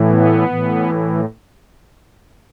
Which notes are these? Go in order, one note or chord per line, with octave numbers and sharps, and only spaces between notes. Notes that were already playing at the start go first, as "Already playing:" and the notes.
Already playing: A2 E3
B3
A2 E3